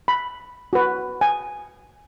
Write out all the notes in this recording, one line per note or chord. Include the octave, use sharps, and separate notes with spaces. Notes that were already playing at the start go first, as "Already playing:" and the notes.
B5
F#4 B4
G#5